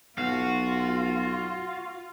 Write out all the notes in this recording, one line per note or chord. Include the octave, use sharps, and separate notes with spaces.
B1 F4 F#4 F5